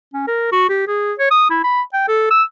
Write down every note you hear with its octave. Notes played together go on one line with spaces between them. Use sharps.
C#4
A#4
F#4
G4
G#4
C#5
D#6
E4
B5
G5
A4
E6